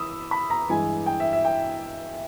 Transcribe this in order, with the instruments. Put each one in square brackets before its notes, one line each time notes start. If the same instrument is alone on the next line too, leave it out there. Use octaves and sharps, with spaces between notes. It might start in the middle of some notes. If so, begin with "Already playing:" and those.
Already playing: [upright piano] E3 B5 D#6 E6
B5
A#5
G2 E3 G#3 G#5
G5
E5
E5
G5